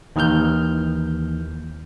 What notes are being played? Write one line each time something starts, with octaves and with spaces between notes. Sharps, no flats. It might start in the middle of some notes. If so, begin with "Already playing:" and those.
D#2 D#3 E3 F6 G6